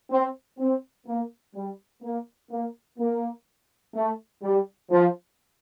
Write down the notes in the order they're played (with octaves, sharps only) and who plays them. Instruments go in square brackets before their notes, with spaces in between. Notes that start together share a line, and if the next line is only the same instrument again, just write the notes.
[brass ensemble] C4
C4
A#3
G3
A#3
A#3
A#3
A3
G3
F3